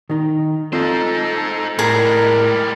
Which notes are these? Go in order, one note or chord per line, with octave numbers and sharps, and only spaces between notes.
D#3 D#4
C4 D#4 F4 A4 C5 D#5
A2 G3 G#3 G#4 A#4 A#5